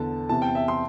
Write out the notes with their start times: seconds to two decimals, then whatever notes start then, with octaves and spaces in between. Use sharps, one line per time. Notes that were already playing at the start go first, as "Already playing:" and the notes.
Already playing: E2 D3 A5
0.29 E2 C3 E3 A5
0.42 G5
0.55 E5
0.68 C6